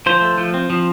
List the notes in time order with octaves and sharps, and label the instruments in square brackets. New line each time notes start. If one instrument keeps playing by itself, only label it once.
[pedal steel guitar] F3 C5
A3
F3
C4
F3